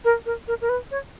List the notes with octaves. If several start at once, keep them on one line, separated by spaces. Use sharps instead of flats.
A#4
A#4
A#4
A#4
B4
C#5